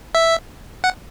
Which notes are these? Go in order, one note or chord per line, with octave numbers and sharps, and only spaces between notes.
E5
F#5